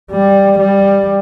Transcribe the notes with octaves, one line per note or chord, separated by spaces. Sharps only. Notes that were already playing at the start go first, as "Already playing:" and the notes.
G3
G3